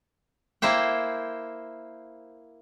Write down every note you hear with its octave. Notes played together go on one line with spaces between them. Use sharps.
A#3 E4 C5 E5 G5